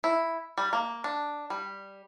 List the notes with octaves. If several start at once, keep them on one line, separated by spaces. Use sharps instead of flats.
E4
G3
A#3
D4
G3